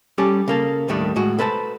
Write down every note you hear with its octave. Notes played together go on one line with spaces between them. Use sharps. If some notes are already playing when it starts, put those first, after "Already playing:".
G3 C#4 G4 A4
C#3 A#3 A4
D#2 A2 D#3 G3 A3 D4
A2 G#3 F#4
A4 B4 C5 F5 A5